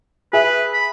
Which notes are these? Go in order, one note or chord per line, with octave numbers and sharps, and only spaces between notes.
G#4 B4 E5
B5